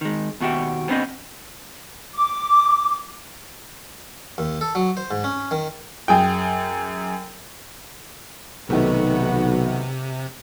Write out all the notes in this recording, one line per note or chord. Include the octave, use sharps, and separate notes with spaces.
D#3 G#3
D#2 B2 F#4 G4 E5
B3 C4 D4 B4 C5 D#5
D6
D#2
A4
F#3
C5
G#2
C#4
D#3
F#2 G#4 G5
B1 C3 D#3 A3 B3 F#4